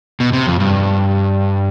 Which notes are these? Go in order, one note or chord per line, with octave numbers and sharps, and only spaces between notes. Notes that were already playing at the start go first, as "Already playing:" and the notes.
B2
C3
F2
G2